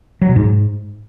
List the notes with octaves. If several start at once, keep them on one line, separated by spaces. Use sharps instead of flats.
F#3
B2
G#2